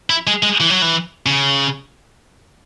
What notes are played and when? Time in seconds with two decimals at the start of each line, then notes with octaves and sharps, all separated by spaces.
0.10 E4
0.27 G#3
0.43 G#3
0.60 E3
0.70 F#3
0.82 E3
1.26 C#3